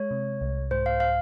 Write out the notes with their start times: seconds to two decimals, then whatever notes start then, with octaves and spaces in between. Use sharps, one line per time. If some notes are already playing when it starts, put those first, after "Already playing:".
Already playing: G#3 C#5
0.11 C3
0.41 C2
0.71 G#2 C5
0.86 F5
1.00 F5